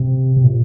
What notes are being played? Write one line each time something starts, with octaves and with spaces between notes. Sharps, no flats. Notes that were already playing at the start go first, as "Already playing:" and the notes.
Already playing: C3
C3
A#2